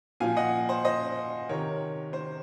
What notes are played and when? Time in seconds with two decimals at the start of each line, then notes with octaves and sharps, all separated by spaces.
0.20 A#2 F3 F5 G#5
0.37 D#5 F#5
0.69 C5
0.85 C5 D#5
1.49 C3 D#3 A#4 C#5
2.13 C5